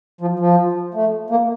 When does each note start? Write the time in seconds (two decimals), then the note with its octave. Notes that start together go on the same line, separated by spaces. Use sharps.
0.21 F3
0.39 F3
0.94 A3
1.30 A#3